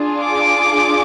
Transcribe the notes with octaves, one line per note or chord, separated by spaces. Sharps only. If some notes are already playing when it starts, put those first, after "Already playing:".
Already playing: D4 F4 G#4
D6